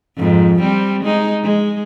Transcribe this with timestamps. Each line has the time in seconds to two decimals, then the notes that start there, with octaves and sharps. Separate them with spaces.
0.17 F2 G#2
0.59 G3 C4
1.04 G#3 D#4
1.43 G#3